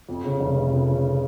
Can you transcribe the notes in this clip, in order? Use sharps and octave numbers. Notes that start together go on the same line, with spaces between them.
F2
C#3
F1
F1
F2
C#3